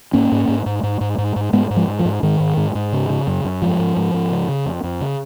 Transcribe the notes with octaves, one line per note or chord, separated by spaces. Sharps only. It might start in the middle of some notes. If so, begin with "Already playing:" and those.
G#2 A#3 C#4
G#2
G#2
G#2
G#2
G#2
G#2
G#2
G#2 G#3 B3
G#2
F3 G#3
G#2
F3
G#2
G#2 D#3
G#2
G#2
G#2
C#3
C#3
F#2
F#2
G#2 F3
G#2
G#2
G#2
C#3
C#3
F2
F2
C#3